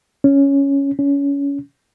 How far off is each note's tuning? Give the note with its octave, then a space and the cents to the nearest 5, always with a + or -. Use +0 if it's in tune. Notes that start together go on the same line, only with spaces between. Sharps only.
C#4 +5
C#4 +25